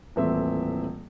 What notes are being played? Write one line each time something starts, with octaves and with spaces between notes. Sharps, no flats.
D#1 A2 E3 C4 A4 E5